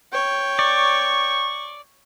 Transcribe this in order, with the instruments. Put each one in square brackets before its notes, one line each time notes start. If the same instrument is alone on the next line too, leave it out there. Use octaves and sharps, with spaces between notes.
[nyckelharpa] C#5 G5
[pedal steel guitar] D5 [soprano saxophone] C#6